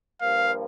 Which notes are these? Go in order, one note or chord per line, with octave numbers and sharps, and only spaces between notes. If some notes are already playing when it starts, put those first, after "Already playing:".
G2 F3 A#3 F5